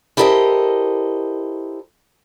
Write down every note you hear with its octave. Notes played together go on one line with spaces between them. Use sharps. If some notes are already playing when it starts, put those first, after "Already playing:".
E4 G4 A4 A#4 C5 D#5